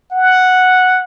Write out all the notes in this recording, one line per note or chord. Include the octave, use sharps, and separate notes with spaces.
F#5